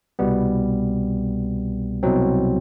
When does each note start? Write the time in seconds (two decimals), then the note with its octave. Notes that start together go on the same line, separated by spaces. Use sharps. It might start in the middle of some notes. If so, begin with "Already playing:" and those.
0.19 C2 B2 G3 B3
2.03 C2 B2 F#3 C4